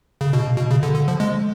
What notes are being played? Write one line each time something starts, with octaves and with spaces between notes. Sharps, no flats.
C#3
B2
B2
C#3
D3
D3
F3
G#3